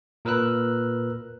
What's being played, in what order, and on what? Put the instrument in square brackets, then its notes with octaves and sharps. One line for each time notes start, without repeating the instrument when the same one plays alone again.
[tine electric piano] A#2 A#4 B4 E6 F#6